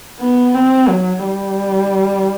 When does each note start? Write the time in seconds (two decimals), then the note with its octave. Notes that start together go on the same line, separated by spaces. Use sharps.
0.20 B3
0.55 C4
0.89 F#3
1.25 G3